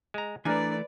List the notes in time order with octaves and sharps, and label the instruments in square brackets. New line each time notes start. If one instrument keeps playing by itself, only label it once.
[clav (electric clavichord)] G#3 A#5
[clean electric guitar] E3 A3 [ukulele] D4 A#4 [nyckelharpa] B4 D5 [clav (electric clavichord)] G#5